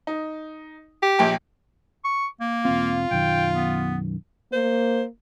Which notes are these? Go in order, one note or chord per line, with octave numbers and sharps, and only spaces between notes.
D#4
G4
A#1 G5
C#6
A#3
E1 C4 F4
B1 F#2 D#3 G5
B3
A#3 C5